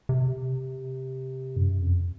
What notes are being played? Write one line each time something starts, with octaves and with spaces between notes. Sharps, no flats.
C3
F#2
F2